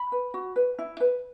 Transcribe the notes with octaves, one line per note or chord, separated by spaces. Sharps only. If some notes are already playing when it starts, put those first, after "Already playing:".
Already playing: B5
B4
F#4
B4
E4
B4